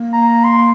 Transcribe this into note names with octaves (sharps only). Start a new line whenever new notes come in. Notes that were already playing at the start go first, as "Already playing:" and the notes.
Already playing: A#3
A#5
C6